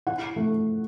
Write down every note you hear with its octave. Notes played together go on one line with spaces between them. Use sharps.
E4 F#5
A3